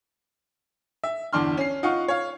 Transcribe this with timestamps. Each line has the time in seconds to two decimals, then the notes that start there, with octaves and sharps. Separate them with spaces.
1.04 E5
1.33 G1 E2 D4 C6 F6
1.57 C#4 C7
1.83 D#4 F4 F5 F#5 C#6
2.08 C#5 F5